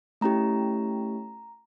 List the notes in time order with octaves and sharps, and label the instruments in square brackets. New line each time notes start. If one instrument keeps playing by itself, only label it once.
[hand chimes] A3 C#4 E4 G4 A#5